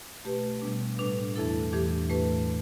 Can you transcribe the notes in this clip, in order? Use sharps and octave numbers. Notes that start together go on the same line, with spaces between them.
B2 A3 G4 B4
B2 G3 B3 D4
A2 G3 D4 B4
E2 E3 A3 E4 A4
E2 E3 A3 D4 G4
A2 A3 G4 B4